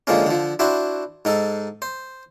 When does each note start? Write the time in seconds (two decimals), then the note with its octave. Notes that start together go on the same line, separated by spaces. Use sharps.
0.07 D3 F3 G#3 A#3 C#4
0.26 D3 F3
0.59 D4 E4 F#4 C5
1.25 G#2 D#4 A4
1.82 C5